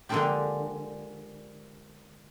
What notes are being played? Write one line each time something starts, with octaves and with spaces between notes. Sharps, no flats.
D3 F3 G#3 A#3 D4 G4